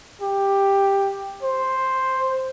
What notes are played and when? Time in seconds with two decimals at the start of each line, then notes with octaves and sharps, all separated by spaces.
0.22 G4
1.43 C5